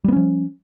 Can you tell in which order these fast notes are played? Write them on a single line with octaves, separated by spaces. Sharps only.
G3 B3 C#4 F3